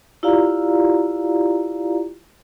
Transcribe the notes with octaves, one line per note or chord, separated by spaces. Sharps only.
E4 F4 G4 D5 F5 A#5